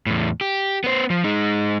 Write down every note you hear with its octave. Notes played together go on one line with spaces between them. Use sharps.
E2 A2
G4
B3 C5
F3
G#3 D#4